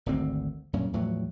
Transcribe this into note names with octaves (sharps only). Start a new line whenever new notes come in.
G#1 D2 D3 C4
F#2 A#2 C#4
E2 A2 F3 F#3